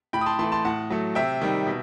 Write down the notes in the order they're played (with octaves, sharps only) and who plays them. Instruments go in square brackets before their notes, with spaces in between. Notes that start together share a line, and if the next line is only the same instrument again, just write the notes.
[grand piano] A2 G5 B5
D#6
A5 C6
E3 A5 C6
A3
A5 C6
A2 F#5 A5
F#3 A3
C3 E5 G5
D#3 G3
B2